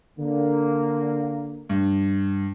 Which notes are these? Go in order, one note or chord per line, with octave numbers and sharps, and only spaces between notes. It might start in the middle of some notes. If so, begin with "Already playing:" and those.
D3 A#3
G2